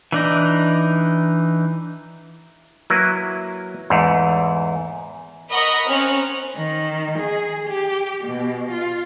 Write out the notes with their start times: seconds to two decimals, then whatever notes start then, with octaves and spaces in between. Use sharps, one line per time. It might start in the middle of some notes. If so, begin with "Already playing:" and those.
0.12 E3 D4 D#4
2.90 F#3 A#3 E4 B4
3.90 E2 G#2 A3
5.51 A#4 D#5 F#5 A#5 B5 C#6
5.88 C4 C#4 F6 F#6
6.56 D#3
7.18 G#4
7.66 G4
8.24 B2
8.71 F4